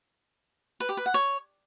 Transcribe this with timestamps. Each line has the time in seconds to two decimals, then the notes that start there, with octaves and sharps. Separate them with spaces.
0.80 B4
0.89 G4
0.97 B4
1.06 F#5
1.14 C#5